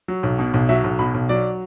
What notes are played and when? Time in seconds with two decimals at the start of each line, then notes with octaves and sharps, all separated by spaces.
0.08 F#3
0.23 B1
0.39 B2
0.54 B1
0.69 F#3 E5
0.84 B1
0.99 B2 B5
1.14 B1
1.29 F#3 D5